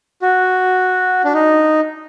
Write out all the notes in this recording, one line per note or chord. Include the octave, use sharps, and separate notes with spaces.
F#4
D4
D#4